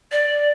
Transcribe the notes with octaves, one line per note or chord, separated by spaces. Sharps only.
D5